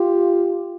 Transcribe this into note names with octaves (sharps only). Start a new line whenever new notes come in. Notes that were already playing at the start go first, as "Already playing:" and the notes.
Already playing: F4 G4